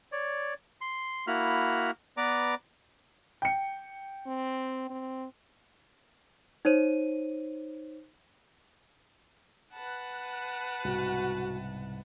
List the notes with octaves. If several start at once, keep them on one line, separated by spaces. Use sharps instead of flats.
C#5 D5
C6
A#3 E4 F#4 B5 F6
B3 B4 D5 A#5 D6
G5 C#7
C4
C4
D#4 C5 C#5 D#7
B4 F#5 A5
C2 G#2 B2 F#4